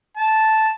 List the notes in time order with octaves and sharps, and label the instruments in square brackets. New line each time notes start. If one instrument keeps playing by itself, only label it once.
[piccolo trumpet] A5